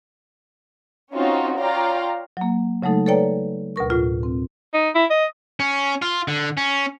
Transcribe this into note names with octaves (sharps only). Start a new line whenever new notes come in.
C4 C#4 D#4 F4 F#4
F4 C#5 D5 F5 G5 A#5
F#3 A#3
C#3 F#3 G#3 A3 D#4 A4
A4 B4 C#5 D5 G5 A#5
D2 B2 A#4 C#6
A2 F4
C4
D#4
E4
D#5
C#4
F4
D3
C#4